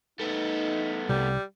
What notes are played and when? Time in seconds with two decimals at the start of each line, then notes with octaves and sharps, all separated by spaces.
0.19 A3 B3 D#4
1.09 C2 G3